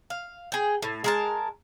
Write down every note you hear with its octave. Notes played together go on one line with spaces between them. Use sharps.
F5
G#4 G5
A2
G#3 A#4 A5